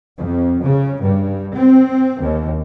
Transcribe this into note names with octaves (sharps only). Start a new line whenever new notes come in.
F2
C#3
G2
C4
D#2